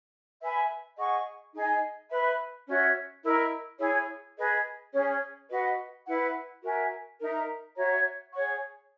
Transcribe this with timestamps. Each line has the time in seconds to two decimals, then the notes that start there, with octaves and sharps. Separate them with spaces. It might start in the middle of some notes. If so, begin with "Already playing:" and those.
0.39 B4 E5 G#5 B5
0.96 G#4 D#5 F#5 C#6
1.53 D#4 G#4 D#5 G#5
2.10 B4 E5 B5
2.67 C#4 F#4 C#5 E5
3.22 E4 A#4 D#5
3.79 E4 G#4 C#5
4.36 G#4 B4 D#5
4.92 C#4 G#4 C#5
5.48 F#4 B4 D#5 F#5
6.05 E4 B4 F#5
6.62 F#4 A#4 E5 G#5
7.18 D#4 A#4 E5 A#5
7.75 F#4 C#5 E5 A#5
8.31 G#4 C#5 F#5 C#6